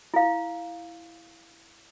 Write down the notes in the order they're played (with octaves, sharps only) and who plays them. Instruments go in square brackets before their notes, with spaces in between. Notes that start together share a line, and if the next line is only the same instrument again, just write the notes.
[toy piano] E4 F5